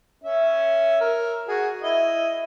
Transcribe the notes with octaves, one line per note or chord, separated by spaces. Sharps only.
C#4 E5
A#4
F#4 G#4
E4 D#5